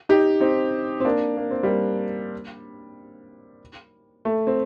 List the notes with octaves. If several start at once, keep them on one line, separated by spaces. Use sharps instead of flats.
D#4 G4
C4 D#4
C4
A#3 D4
A#3
C4
G3 A#3
A3
C4